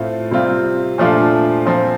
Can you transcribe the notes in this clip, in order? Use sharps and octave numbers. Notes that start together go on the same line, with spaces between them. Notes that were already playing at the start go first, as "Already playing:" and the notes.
Already playing: A2 A3 C4 F4
C3 G3 C4 F4
A#2 F3 A3 D4 F4
A#2 F3 C4